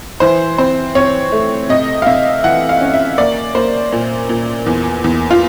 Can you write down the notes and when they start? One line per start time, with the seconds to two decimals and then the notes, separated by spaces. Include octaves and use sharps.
0.20 E3 C5
0.58 C4 C5
0.95 C4 C#5
1.32 A3
1.69 C3 D#5
2.02 F5
2.06 C3 E5
2.44 E3 F#5
2.69 F5
2.81 C#4
2.94 E5
3.18 A#3 D5
3.55 A#3 C5
3.93 A#2
4.29 A#2
4.66 E2
5.04 E2
5.31 F4